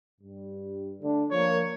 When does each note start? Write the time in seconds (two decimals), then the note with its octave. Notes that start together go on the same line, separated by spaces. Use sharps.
0.21 G2 G3
1.01 D3 A3 D4
1.31 F3 A#3 C#5